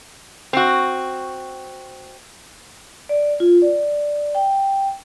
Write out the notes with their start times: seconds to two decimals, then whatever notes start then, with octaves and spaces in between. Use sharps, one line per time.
0.53 C4 F#4
3.09 D5
3.40 F4
3.62 D5
4.35 G5